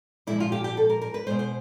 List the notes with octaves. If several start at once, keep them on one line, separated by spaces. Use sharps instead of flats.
A#2 F3 G#3 E4
F4
G4
G4
A4
A#4
A#4
B4
B2 G#3 C5
C5